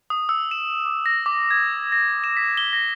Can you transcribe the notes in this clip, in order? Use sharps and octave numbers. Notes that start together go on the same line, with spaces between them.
D#6
E6
E7
D6
A#6
D6
G#6
A#6
E7
B6
G7
A#6